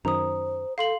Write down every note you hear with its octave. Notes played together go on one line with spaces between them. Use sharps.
F#2 D#3 C5 A#5 D#6
A4 F5 C6 F#7